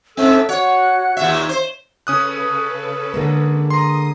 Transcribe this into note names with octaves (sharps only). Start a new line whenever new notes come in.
G#2 C4 A4 E5 E6
F#4 C#5 F#5 F#6
D#2 A#2 E5
C5
C#3 C#4 A4 B4 D#6 F#6
D3 G#3 A#3
A#5 C6 D#6